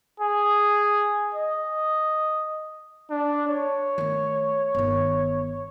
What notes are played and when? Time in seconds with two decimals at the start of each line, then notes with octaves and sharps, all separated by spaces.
0.20 G#4
1.35 D#5
3.10 D4
3.48 C#5
3.98 D#3 A3
4.75 G1 D#3